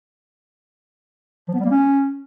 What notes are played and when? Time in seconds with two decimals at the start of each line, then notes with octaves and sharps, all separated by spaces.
1.48 F3
1.54 B3
1.59 G3
1.65 A#3
1.71 C#4